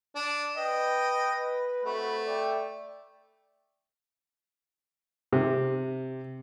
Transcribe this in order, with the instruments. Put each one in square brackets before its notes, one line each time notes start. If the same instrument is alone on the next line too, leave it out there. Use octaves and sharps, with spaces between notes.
[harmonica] D4
[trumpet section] B4 [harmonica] D#5 G5
[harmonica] A3 [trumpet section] C4 F#4 B5
[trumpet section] D5 E5 G5
[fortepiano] C3